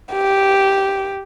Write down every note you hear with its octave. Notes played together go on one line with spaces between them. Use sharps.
G4